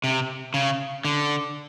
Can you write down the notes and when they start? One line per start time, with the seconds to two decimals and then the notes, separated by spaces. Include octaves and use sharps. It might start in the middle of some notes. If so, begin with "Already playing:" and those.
0.04 C3
0.54 C#3
1.05 D3